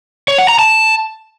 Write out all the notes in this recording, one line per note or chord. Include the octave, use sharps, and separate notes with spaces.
C#5
F#5
A#5
A5